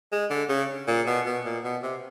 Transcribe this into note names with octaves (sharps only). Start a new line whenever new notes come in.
G#3
D3
C#3
A#2
B2
B2
A#2
B2
C3